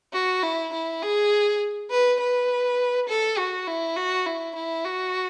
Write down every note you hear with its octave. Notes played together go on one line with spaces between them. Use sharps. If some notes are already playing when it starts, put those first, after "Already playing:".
F#4
E4
E4
G#4
B4
B4
A4
F#4
E4
F#4
E4
E4
F#4